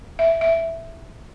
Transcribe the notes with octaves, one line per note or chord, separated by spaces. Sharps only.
E5
E5